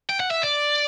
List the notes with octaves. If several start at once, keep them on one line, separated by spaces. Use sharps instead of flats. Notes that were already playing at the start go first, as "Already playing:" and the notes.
G5
F#5
E5
D5